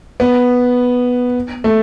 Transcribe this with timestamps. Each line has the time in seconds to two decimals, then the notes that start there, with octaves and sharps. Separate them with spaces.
0.20 B3
1.64 A3